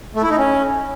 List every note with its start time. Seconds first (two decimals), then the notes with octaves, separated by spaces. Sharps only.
0.15 A3
0.23 E4
0.30 D#4
0.38 C#4